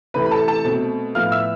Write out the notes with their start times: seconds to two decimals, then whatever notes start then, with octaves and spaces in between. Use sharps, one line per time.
0.14 C3 E3 A3 C4 B4 B5
0.26 B5
0.31 A4 A5
0.48 A4 A5
0.65 B2 A3 C4
1.15 A2 F3 B3 F5 F6
1.32 E5 E6